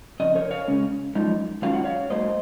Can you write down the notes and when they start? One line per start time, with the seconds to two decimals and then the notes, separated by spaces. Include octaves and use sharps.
0.20 F2 C#3 D#5
0.35 A#4 C#5
0.51 C#5 F5
0.67 C#3 G#3 C#4
1.15 F#2 F3 G#3 D#4
1.62 G#2 D#3 F#3 C#4 F4 F5
1.73 F#5
1.84 C#5 F5
2.10 G#2 F#3 A#3 C5 D#5